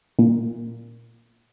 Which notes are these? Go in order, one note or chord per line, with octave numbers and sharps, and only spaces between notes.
A#2